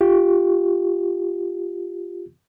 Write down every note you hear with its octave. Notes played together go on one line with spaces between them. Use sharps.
F4 G4